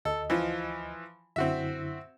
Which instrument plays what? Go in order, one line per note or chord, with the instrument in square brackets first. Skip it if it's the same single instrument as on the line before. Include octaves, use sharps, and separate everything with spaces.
[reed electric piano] D2 D#5 [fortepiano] A4
[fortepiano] E3 F3
[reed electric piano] F#2 D3 E4 [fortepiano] C4 F#4 E5